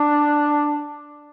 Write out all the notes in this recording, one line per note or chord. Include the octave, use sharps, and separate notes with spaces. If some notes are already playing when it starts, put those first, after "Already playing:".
Already playing: D4